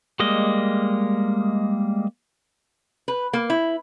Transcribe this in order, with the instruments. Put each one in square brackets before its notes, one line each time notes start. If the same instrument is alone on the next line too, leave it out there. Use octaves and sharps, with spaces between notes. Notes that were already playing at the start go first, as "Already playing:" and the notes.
[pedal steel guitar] G3 G#3 A#3 D#5
[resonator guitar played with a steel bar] B4
A#3
E4